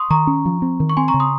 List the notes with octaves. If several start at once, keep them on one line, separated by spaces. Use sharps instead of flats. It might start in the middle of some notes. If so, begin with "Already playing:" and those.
Already playing: C6 C#6 D#6
D#3 A#5 C#6
C#4
F3
C4
D#3
C#6
C4 G#5 C6
A#5 C#6
C#3
C6 D#6